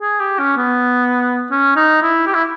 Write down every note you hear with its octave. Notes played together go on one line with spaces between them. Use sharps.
G#4
G4
C#4
B3
C#4
D#4
E4
G4
E4